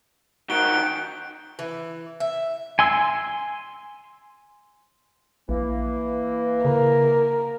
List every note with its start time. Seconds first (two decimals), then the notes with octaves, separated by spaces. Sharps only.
0.50 D#3 F#4 F#6 G6 D7 G7
1.59 E3
2.20 E5
2.79 G#5 C6 E6
5.49 A#1 E3 A#3
6.65 C#3 A#4